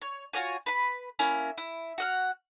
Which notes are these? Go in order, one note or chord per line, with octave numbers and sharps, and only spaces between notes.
C#5
F4 F#4 C#5 G#5
B4 B5
A#3 C#4 E4
E4
F#4 F#5 F6